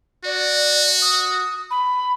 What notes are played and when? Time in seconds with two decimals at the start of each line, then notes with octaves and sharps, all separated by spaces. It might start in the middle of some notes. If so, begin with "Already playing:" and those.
0.25 F#4 D5
1.02 D#6
1.70 B5